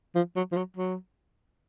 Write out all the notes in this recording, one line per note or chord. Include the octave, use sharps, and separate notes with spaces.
F3
F#3
F3
F#3
F#3